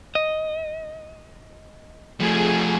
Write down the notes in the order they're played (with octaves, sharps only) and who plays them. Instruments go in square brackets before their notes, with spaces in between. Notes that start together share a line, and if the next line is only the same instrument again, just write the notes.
[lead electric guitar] D#5
[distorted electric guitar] F3 A3 [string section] G#4